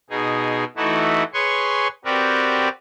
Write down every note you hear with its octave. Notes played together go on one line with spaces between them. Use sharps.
B2 D#4 G#4
E3 A3 D#4 E4 F#4
G#4 B4 C#5 G#5 C6 C#6
C4 F#4 G4 A#4 B4 D5